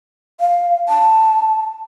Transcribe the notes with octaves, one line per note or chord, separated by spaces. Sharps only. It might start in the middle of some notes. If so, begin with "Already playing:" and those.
F5
A5